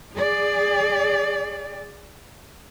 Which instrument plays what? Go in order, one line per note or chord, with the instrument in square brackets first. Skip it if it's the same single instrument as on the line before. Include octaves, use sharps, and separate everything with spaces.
[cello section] G#4 D5